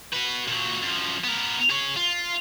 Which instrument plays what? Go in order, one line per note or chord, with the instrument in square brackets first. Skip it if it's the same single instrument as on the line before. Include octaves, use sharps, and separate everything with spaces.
[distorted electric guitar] F#4 B4
A#2 F#3
F#2 F3
B3 A#4
G#4 C#5
F4